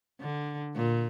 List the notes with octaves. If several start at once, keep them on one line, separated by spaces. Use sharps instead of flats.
D3
A#2